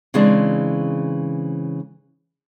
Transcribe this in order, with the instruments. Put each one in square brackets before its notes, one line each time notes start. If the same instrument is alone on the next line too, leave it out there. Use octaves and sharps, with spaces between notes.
[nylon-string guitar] C#3 E3 G#3 C4 D4